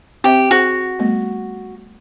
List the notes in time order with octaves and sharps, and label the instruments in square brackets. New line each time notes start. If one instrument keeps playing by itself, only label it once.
[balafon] C4 C5 E5 [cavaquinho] G4
[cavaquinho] F#4 [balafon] G#4 C5 G5
[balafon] G3 A3 B3